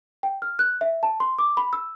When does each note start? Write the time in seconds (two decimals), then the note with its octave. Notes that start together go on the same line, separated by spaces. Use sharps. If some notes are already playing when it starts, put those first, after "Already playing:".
0.23 G5
0.42 F6
0.59 F#6
0.81 E5
1.03 A5
1.20 C6
1.39 D6
1.57 B5
1.73 E6